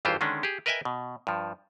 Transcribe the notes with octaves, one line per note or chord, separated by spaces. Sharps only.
G#1 G2 E3 F4 G4 C5
D3 D#3 G#3 C#4 D4
G4 G#4
A#4 B4 D#5 E5 G5 G#5
B2
G2 F3